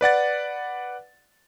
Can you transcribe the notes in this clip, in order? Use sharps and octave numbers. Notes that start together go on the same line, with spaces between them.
B4 D5 F#5 A6